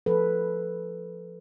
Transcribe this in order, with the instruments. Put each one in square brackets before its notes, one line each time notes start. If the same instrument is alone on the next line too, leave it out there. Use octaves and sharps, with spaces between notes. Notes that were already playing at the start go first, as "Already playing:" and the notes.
[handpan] F3 A4 B4